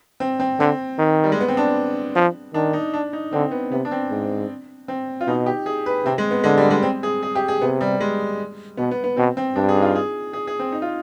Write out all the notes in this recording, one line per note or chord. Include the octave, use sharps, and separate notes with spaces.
C4
C4
D3 C4
D#3
G3
G#3
B3
C4
D4
F3
D#3 D4
D#4
D4
D#4
D3 C4
B3
C3 B3
D4
C4
G#2
C4
F4
B2 D#4
G4
G#4
B4
C3 C4
G#3
B3
D3 G#3
G3
G#3
C4
G#4
G#4
G4
G#4
C3 B3
G3
G#3
B2 B3
B3
B3
B2 C4
C4
G2 D4
G#4
D#4
F4
G#4
G#4
G#4
C4
D#4
F4